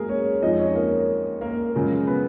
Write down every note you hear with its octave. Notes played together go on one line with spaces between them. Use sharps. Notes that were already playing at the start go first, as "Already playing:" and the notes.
Already playing: F#3 G#3 A#3 G#4 A#4
C#4 C#5
F2 F3 G#3 D#4 D#5
C#4 C#5
A#3 A#4
A#3 A#4
F#2 C#3 F3 G#3
B3 B4